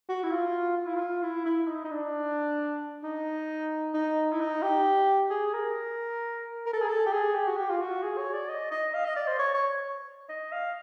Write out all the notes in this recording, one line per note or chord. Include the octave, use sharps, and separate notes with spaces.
F#4
E4
F4
F4
E4
F4
E4
E4
D#4
D#4
D4
D#4
D#4
E4
D#4
G4
G#4
A#4
A#4
A4
G#4
A4
G4
G#4
G4
F#4
G4
F4
F#4
G#4
C#5
D5
D#5
D#5
F5
D#5
D5
C5
C#5
C#5
D#5
F5